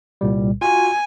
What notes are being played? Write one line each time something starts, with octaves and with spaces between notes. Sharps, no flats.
C2 A#2 G3
F4 F#4 G#5